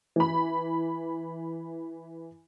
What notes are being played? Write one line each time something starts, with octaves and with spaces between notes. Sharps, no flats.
E3 B5